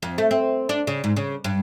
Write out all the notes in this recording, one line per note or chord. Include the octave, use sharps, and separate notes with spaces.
F2
A3
C4
D4
C#3
G#2
C#3
G2